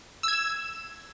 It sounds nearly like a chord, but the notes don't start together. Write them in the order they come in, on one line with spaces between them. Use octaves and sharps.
E6 G#6 E7